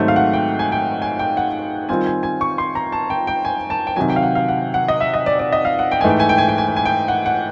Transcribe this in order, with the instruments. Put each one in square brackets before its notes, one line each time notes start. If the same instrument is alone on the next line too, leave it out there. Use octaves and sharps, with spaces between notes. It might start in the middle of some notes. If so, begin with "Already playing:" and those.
Already playing: [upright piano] G#2 D#3 F#3 A3 C4
F5
F#5
G5
G#5
G5
G#5
G5
F#5
D#3 G3 C4 F4 G#5
G#5
G#5
C#6
C6
A#5
A5
G5
G5
G#5
A5
G5
C3 D#3 F#3 G#5
G5
F5
F#5
F5
F#5
F#5
D#5
E5
D#5
D5
D5
D#5
F5
F#5
G5
G#2 E3 A3 G#5
G5
G#5
G5
G#5
G5
G#5
G5
G#5
G5
F#5
F#5